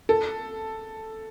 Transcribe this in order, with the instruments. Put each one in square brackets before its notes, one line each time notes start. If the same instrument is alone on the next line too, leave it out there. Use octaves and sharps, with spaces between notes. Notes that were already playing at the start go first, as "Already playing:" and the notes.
[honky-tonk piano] A4